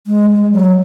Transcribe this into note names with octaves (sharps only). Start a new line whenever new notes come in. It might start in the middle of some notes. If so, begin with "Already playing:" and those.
G#3
G#3
F#3